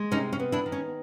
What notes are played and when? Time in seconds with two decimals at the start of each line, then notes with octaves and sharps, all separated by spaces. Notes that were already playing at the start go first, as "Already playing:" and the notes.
Already playing: G#3
0.11 C3 C#4 D#4
0.33 C#4
0.39 B3
0.52 D4 E4
0.66 D#3
0.72 C#4